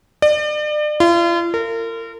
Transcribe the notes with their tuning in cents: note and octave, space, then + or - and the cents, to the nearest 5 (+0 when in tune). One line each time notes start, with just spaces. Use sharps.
D5 +35
F4 -40
A#4 -35